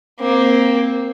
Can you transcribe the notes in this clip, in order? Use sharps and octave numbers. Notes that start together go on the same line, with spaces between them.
A#3 C4